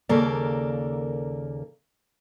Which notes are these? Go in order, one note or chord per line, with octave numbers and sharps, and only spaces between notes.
D#2 C#3 A#3 A4 A#4 D5